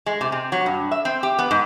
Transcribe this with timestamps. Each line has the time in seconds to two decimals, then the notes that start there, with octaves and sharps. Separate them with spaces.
0.06 G#3
0.21 C3
0.32 C3
0.52 F#3
0.66 G2
0.91 E5
1.05 C4
1.23 G4
1.39 B3
1.51 G#2